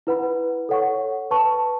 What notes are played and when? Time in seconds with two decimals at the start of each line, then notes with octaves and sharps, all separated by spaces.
0.07 E4 B4 F#5 B5
0.69 A4 C#5 F#5 C#6
1.31 B4 A5 C#6